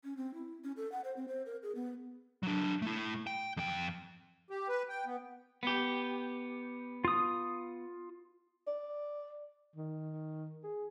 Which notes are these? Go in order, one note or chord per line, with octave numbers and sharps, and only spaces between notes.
C#4
C4
E4
C#4
A4
F#5
C5
C4
C5
A#4
G#4
B3
F#3 D4
A3 E4
G5
F2 G5
G4
B4
G5
B3
B3 G4
F4 D#6
D5
D#3
G#4